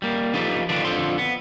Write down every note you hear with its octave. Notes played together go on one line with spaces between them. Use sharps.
G3 A#3
F3 D#4 G4 A4 B4
D3 D#3 D4 F4 B4 D5
F2 D3 F3 A4 C6
B3